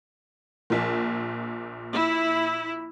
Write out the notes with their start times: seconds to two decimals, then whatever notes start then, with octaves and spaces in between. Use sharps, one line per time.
0.70 A#1 A#2
1.93 E4